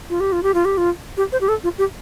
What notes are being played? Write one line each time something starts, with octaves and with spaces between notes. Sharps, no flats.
F4
G4
F4
G4
F4
G4
F4
G4
C5
G4
A4
F4
G4